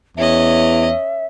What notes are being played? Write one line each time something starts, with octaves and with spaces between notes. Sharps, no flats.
E2 C#4 D#5 E5